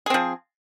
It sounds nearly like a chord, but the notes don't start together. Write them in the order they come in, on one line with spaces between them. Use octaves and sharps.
G#4 C4 F3